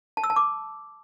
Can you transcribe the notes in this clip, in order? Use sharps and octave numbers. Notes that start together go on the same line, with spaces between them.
A5
E6
A5
D6